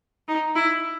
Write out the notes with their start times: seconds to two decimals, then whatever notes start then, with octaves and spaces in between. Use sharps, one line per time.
0.28 D#4
0.56 E4